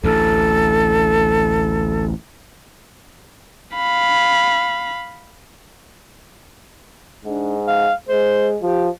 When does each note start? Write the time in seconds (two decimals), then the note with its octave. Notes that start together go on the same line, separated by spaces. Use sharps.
0.04 A1 D2 A4
3.75 F5 B5
7.25 G#2 D4
7.67 F5
8.09 G#3 C5
8.62 F3 G4